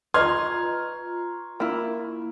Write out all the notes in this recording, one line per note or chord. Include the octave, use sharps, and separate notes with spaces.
F4 B4 D#5 A#5 C6 C#6 F6 G#6
A#3 E4